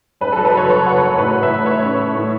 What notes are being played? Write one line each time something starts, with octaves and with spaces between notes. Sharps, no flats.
F#2 B4
A4
F#3
B4
F#1 C#5
F#1 C#5
F#1 F#5
F#2
A2 B4
A1
E5
A3
A3 C#5
C#4
A3
A2